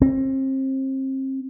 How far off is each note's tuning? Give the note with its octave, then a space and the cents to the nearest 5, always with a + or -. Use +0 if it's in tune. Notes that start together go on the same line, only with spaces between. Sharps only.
C4 +30